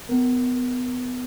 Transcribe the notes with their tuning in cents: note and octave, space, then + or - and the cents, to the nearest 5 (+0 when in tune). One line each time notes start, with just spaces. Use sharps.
B3 +25 A#4 +0